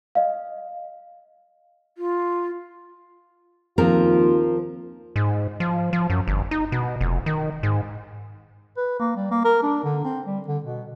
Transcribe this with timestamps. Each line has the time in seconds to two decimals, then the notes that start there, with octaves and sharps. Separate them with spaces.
0.15 D#5 F5
1.98 F4
3.78 D#2 F3 C4 F4 A#4
5.16 G#2
5.60 F3
5.93 F3
6.10 F#2
6.28 G1
6.51 D#4
6.72 B2
7.01 F1
7.26 D#3
7.63 G#2
8.77 B4
8.99 A#3
9.16 G3
9.31 A#3
9.44 A#4
9.63 D4
9.84 D3
10.04 C4
10.26 G3
10.48 D3
10.64 B2